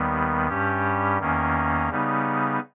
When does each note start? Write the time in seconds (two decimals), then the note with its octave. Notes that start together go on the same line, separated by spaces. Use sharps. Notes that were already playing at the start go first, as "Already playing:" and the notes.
Already playing: D#2 D#3 G3 B3
0.48 G2 G3 C#4 G4
1.19 E2 D#3 A#3 C#4
1.90 C#3 G3 B3 D#4